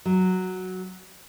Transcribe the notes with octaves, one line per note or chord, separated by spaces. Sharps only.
F#3